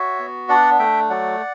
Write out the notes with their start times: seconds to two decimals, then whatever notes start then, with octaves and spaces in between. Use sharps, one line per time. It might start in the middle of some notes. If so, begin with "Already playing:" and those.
Already playing: F#4 C#5 E5
0.19 B3
0.49 D4 D5 F#5
0.79 A3 E5 G5
1.10 F#3 D5 F#5